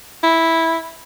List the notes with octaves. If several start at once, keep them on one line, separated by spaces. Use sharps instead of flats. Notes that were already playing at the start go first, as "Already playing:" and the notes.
E4